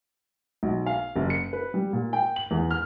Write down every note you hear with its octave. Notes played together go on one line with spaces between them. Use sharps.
B1
F5
F#1
C#7
B4
G3
A#2
G5
F#7
E2
F6